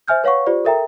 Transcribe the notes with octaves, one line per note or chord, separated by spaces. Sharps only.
C5 E5 G#5 F6 G6
B4 C#5 F5 F#5 C#6
F4 G4 C5 D5
A4 A#4 E5 G5 A#5